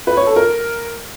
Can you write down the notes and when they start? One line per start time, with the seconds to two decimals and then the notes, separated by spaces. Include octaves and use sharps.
0.07 B4
0.17 C#5
0.27 A4
0.36 A#4